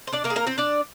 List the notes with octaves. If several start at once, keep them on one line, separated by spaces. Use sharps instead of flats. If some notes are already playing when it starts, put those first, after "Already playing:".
C5
D4 D5
A#3 A#4
G#4
A#3 A#4
C4 C5
D4 D5